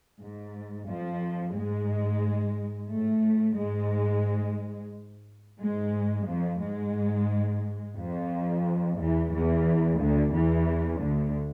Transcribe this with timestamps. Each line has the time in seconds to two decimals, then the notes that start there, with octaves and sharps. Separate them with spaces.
0.19 G#2
0.88 F2 F3
1.54 G#2 G#3
2.91 A2 A3
3.57 G#2 G#3
5.60 G#2 G#3
6.27 F2 F3
6.61 G#2 G#3
7.96 F2 F3
8.98 E2 E3
9.32 E2 E3
9.99 D2 D3
10.33 E2 E3
11.00 D2 D3